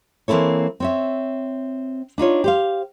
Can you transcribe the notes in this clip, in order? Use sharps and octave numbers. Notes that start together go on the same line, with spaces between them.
E3 A#3 C4 E4 A4 C#5
C4 C#5 E5
D4 D#4 F4 C#5
G4 C5 F5